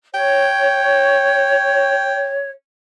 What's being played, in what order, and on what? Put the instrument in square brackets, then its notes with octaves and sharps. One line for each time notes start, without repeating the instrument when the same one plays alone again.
[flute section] C#5 [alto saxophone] G5